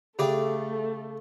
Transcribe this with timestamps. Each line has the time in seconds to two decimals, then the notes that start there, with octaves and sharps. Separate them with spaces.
0.19 C#3 A3 G4 A4 D5 E5 G5